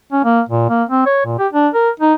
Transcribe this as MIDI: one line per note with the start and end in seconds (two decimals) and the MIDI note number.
0.12 0.23 61
0.24 0.41 58
0.49 0.67 46
0.70 0.83 58
0.89 1.05 60
1.06 1.24 73
1.25 1.38 46
1.39 1.48 67
1.53 1.68 62
1.74 1.90 70
2.00 2.14 63